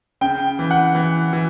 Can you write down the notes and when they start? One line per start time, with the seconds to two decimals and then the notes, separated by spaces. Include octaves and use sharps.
0.21 C#3 G5
0.59 E3
0.71 F#5
0.95 E3
1.33 E3